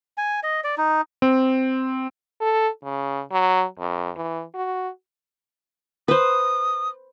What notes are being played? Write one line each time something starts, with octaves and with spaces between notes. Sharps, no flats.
G#5
D#5
D5
D#4
C4
A4
C#3
F#3
F2
E3
F#4
B4 C5 D#6